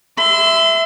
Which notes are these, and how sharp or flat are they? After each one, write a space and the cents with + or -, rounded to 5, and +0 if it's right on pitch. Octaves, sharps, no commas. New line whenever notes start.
E5 +0 C6 -40